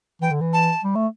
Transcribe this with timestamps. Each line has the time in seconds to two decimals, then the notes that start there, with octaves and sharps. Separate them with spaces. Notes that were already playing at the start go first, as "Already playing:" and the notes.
0.22 E3 G5
0.31 D3
0.41 E3
0.53 A5
0.84 G3
0.96 A3